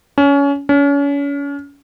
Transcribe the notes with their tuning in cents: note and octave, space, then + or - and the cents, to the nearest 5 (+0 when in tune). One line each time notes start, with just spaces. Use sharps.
C#4 +25
C#4 +35